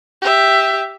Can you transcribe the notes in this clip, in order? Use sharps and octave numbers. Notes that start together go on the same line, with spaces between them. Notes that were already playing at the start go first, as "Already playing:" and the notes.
G4 E5